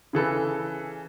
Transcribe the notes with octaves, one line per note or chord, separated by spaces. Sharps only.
C#3 E3 A4 B4